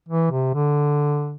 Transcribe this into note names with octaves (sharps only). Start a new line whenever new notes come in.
E3
C3
D3